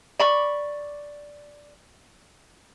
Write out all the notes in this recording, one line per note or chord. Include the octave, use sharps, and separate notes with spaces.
D5 B5 C#6